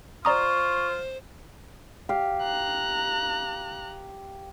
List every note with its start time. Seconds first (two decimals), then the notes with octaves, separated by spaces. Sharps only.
0.25 F4 C5 D5 A#5 C#6 D#6
2.09 G4 F5
2.43 A#5 F#6